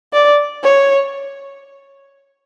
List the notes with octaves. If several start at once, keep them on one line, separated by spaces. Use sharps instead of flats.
D5
C#5